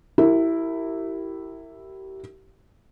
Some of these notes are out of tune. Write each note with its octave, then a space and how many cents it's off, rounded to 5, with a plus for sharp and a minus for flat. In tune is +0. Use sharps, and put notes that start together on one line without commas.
E4 +0 G4 -30 A#4 -30